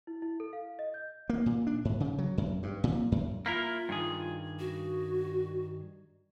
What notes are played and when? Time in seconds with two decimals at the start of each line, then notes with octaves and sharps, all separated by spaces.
0.07 E4
0.22 E4
0.40 A4
0.53 F5
0.79 D#5
0.94 G6
1.29 A#3
1.46 A#2
1.67 D4
1.85 G#2
2.00 C#3
2.19 F#3
2.38 F#2
2.63 G2
2.84 A#2
3.12 F#2
3.46 A#3 E4 F4 A#4
3.89 G2 D#3 G#4
4.59 F#4